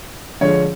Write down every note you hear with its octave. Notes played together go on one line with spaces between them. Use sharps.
D3 F3 G#3 C#5